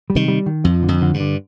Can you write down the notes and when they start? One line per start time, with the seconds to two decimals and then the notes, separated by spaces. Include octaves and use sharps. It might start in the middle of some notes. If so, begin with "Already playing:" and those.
0.10 G3
0.15 C3 D#3
0.28 G3
0.46 D#3
0.64 F2 F3
0.83 D3
0.88 F2
1.02 D3
1.14 G2
1.20 D3